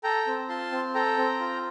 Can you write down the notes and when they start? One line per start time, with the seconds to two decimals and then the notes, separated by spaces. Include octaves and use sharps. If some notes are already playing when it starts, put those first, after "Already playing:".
0.04 A4 G5 A#5
0.27 C4
0.49 F4 A5 C6
0.72 C4
0.94 A4 G5 A#5
1.17 C4
1.40 F4